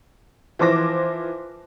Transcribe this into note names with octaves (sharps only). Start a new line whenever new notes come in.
E3 F3 C5 D6 A#6